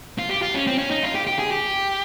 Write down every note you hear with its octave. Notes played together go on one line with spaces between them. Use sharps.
F4
G4
F4
C#4
C4
C#4
D#4
F4
G4
G4
G#4
G4